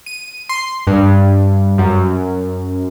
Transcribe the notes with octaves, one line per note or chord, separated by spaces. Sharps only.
D#7
C6
G2
F#2